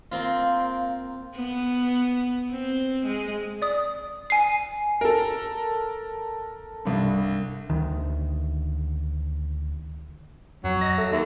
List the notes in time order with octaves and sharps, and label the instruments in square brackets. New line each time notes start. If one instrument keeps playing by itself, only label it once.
[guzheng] A#3 C4 F4
[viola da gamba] B3
C4
G#3
[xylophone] D5 D#6
G#5 C7
[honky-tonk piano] A4 A#4
[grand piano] C2 G2
[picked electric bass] D2 D#3
[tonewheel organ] F2 [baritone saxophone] F#3
[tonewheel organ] D#5 A#6
A4 E5
[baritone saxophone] D#2